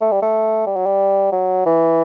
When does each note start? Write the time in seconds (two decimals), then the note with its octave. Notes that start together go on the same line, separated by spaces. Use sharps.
0.01 A3
0.12 G3
0.22 A3
0.67 G3
0.76 F#3
0.86 G3
1.32 F#3
1.66 E3